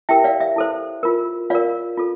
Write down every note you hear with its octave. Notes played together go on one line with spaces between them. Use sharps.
E4 G4 A#4 E5 G5
D5 F5
E5
E4 A4 C5
F4 A#4
F4 A#4 D5 F5
F4 A4